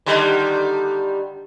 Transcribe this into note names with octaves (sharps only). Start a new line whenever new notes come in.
D3 D#3 G3